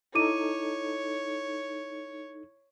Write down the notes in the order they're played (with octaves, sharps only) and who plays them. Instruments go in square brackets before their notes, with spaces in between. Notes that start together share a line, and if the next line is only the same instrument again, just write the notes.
[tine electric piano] D#4 A4 [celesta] E4 D6 D#7 [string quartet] C#5